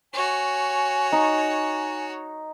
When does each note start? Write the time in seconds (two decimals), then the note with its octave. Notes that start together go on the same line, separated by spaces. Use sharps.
0.13 F#4 C#5 G#5
1.12 D#4